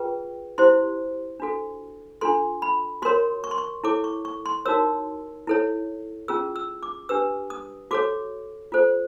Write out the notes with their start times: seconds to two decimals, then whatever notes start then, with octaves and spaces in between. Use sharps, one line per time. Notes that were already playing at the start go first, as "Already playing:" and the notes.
Already playing: F4 G#4 B4 G5
0.58 E4 G4 C5 C6
1.40 D4 F#4 A4
2.21 D4 F4 A4 C6
2.62 B5
3.02 F#4 A#4 C#5 C6
3.44 C#6
3.51 C6
3.58 C#6
3.84 E4 A4 C#5 D6
4.04 C#6
4.25 C#6
4.46 C6
4.65 D#4 F#4 A#4 C#5 E6
5.47 E4 A4 C#5
6.28 C#4 F4 G#4 E6
6.56 E6
6.83 D6
7.09 D4 G4 B4 E6
7.50 D#6
7.91 F#4 A4 C#5 D6
8.72 F4 A4 C5